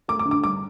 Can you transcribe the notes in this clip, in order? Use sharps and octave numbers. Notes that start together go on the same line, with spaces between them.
A3 D6
D6
D3
D6
G2 D6